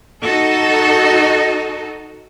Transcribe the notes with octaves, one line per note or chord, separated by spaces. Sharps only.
D#4 F#4 A4